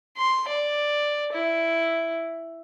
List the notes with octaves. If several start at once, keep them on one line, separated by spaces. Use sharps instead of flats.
C6
D5
E4